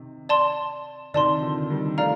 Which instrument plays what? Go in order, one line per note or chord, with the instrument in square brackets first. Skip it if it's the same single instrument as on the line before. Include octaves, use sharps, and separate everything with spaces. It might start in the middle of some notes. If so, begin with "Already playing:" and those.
Already playing: [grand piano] C3 D#3
[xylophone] D5 A5 C6
[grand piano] C3 D#3 [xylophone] D5 A5 C6
[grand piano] D3 F3
D#3 G3
[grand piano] F3 A3 [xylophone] D5 F5 A#5 F6